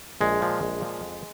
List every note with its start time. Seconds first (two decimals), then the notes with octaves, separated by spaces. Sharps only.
0.21 A#1 G#3
0.40 A#2 F3
0.61 A#1
0.81 A#2 F3
1.02 F2